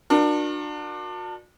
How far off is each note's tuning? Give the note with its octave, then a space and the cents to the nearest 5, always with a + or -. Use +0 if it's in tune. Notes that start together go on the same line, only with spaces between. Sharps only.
D4 +25 F#4 -35 A#4 +15